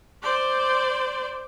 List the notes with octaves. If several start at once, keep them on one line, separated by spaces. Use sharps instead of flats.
C5 D5